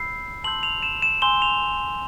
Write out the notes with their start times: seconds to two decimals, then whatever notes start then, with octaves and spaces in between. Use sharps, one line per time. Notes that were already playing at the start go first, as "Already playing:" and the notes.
Already playing: B5 E6 G6 C7
0.44 A5 C6 E6 G6 F#7
0.63 F7
0.83 E7
1.02 E7
1.22 G#5 C6 E6 G6 G7
1.42 F7